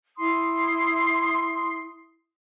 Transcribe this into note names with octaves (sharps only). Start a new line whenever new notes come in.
E4 C6 D#6